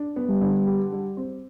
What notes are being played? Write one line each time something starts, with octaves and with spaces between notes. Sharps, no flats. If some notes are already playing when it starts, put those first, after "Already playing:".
Already playing: D4
B3
G3
D3
G4
G3
C4